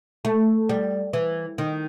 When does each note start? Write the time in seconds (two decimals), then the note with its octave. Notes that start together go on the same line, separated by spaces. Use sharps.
0.25 A3
0.69 G3
1.13 E3
1.58 D#3